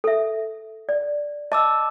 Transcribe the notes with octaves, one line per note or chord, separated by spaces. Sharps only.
A4 E5
D5
D#5 A5 D6 E6